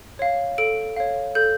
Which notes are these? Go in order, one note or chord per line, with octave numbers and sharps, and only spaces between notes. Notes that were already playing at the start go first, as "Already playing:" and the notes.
C#5 F5
A4 D7
C#5 F5
A4 G6